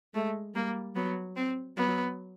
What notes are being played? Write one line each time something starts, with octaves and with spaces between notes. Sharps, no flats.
G#3 A3
G3 A#3
F#3 B3
C4
F#3 B3